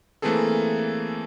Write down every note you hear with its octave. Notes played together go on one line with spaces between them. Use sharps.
E3 A3 A#3 C4 G#4 A4